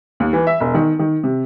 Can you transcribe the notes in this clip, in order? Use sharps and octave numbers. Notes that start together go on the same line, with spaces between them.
D#2
E3
E5
E1
D#3
D#3
C3